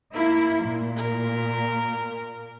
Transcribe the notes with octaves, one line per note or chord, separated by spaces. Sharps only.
A#3 E4
A#2
A#4